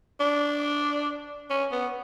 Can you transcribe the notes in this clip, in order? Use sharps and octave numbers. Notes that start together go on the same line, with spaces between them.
D4
C#4
B3